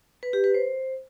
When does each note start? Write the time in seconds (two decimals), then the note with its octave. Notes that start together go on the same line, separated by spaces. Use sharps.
0.23 B4
0.33 G4
0.44 B4
0.54 C5